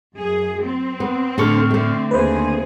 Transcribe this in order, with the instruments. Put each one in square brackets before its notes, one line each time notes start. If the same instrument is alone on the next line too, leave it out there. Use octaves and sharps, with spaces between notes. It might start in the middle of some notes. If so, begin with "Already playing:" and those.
[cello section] F#2 G#4
C4
[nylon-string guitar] B3
[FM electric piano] A2 C#6 F6 [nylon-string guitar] D3 D4 A4
[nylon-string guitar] D3 A3
[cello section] D#2 C4 G#4 [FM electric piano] B4 C5